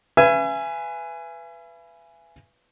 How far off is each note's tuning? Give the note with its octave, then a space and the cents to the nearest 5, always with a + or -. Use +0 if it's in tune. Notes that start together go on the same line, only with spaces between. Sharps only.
B4 +0 E5 +40 G#5 +0